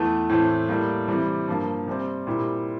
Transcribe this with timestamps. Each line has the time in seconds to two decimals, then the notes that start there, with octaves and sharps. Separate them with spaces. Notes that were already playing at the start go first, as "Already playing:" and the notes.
Already playing: E2 E3 A3
0.29 A2 E3 A3 C4
0.69 A2 G3 A#3
1.08 C3 E3 G3
1.47 G2 F3 A#3
1.87 C3 G3 C4
2.27 A#2 G3 C4 E4 G4